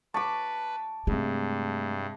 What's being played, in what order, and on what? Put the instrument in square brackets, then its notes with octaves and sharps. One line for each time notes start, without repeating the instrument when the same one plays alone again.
[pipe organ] B4 [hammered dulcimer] A5 D6 [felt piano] C#6
[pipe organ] G2 [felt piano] C3 G#3 [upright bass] A3